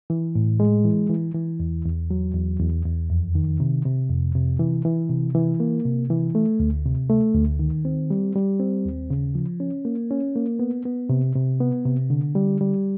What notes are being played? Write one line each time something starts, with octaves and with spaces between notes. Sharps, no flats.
E3
A2
G#3
E3
E3
E3
E2
E2
F#3
E2
E2
E2
F2
D#3
C3
C3
F2
C3
E3
E3
C3
E3
A#3
C3
E3
A3
D2
C3
A3
D2
D#3
C4
G3
G3
C4
D#2
C#3
F3
C#4
A#3
C#4
A#3
B3
B3
C3
C3
B3
C3
D3
G3
G3